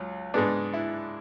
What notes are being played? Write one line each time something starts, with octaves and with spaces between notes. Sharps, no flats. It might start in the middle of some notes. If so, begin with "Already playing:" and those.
Already playing: C#2 F#3
G#2 G#3 B3 D4
E4